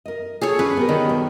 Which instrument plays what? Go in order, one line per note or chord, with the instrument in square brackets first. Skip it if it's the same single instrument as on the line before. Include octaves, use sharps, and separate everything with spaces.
[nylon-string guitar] A#4 D#5
[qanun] G#4 A4 C#5
[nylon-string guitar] C#4 D4 G#4 [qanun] B4
[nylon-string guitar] B3 G4 A#4
[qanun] D#3
[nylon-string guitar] B2 D3 G3